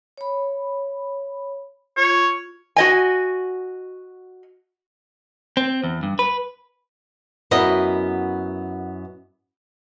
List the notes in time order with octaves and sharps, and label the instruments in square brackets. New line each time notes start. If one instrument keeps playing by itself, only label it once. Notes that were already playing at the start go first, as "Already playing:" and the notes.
[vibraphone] C#5 B5
[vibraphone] F4 [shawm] C#5
[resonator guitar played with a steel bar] F#4 D#5 G#5
[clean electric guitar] C4
E2
G2
B4
[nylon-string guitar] F#2 B3 E4 A#4 D#5